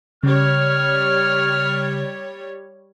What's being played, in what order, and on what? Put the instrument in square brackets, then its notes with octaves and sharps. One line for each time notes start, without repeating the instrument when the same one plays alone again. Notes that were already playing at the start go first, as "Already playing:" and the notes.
[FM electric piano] C#3 [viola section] G3 C#5 [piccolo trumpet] F6